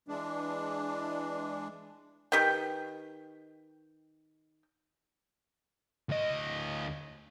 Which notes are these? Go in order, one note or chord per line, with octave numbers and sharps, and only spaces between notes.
E3 G#3 D4
D#3 G4 B4 G5
D2 D#5